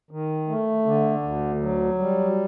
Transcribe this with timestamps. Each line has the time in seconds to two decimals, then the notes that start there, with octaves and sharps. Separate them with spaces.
0.11 D#3
0.48 A3
0.85 D3
1.23 D2
1.62 F#3
1.99 G3